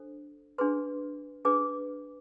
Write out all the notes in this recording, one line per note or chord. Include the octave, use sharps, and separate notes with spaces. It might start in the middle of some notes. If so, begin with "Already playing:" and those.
Already playing: D4 A4 C5
D4 G#4 B4 C6
D4 G#4 B4 D6